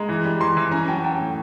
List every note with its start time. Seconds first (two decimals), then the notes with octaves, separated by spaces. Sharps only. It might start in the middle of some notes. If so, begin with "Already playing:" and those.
Already playing: G#3 A#5
0.09 E3
0.25 G3
0.40 E3 A#5 C6
0.57 E3
0.72 C#4 G#5 A#5
0.88 F#3 G5 A5
1.04 C#4 G5 A5
1.20 A2